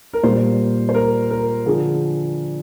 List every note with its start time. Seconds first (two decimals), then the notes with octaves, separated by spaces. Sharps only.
0.13 A#4
0.23 A#2 G3 C5
0.89 C5
0.94 A#4
1.30 A#4
1.66 D3 F3 G#4